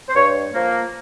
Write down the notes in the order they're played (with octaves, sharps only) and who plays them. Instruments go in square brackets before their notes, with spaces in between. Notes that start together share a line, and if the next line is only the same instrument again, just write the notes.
[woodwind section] C5
G2 C#5
F3 A#3